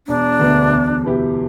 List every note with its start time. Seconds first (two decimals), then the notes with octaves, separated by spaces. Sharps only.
0.07 E1 D4
0.39 D2 D3 B3
0.72 E2
1.04 B2 B3 E4 G4